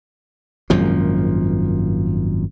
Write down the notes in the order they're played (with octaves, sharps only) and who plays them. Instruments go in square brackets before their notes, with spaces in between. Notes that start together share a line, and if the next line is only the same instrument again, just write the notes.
[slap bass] G#1 F#2 A#2 F3